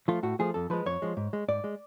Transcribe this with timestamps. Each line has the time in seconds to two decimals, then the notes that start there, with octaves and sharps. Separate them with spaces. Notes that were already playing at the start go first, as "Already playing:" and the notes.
0.08 F3 A3 F4
0.23 A2 F#4
0.39 F3 A3 G#4
0.54 F2 A4
0.70 F3 G#3 B4
0.86 F2 C#5
1.02 F3 G#3
1.17 G#2
1.33 G#3
1.48 G#2 D5
1.64 G#3